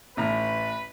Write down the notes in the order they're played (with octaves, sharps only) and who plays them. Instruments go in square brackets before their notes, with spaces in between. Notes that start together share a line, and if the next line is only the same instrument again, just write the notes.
[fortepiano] A1 A2 A#5 [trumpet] B4